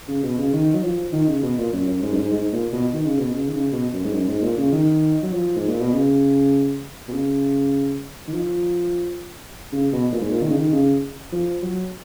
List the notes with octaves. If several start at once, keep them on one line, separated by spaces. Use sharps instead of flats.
C#3
B2
C#3
D#3
F#3
F3
D#3
C#3
B2
A#2
F#2
F#2
G#2
F#2
G#2
G#2
A#2
B2
D#3
C#3
B2
C#3
D#3
C#3
B2
F#2
G#2
F#2
G#2
A#2
C#3
D#3
F#3
F3
G#2
A#2
B2
C#3
B2
C#3
D#3
F3
C#3
B2
A#2
G#2
A#2
D#3
C#3
D#3
C#3
F3
F#3